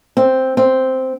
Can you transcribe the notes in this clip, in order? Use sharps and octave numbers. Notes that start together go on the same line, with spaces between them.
C4
C4